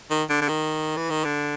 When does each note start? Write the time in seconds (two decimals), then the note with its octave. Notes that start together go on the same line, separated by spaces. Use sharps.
0.10 D#3
0.29 D3
0.42 D3
0.49 D#3
0.97 E3
1.10 D#3
1.24 D3